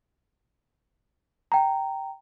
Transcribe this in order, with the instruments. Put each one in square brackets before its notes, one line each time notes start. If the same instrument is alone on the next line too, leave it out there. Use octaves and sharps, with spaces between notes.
[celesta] G5 A#5